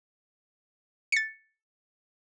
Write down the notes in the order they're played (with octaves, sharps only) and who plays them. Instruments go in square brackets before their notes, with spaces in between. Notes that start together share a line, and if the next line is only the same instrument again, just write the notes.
[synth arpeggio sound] A6 C#7